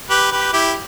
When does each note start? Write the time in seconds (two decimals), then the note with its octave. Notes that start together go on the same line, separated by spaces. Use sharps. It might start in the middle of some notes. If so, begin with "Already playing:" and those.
0.10 G4 B4
0.32 G4 B4
0.53 E4 G4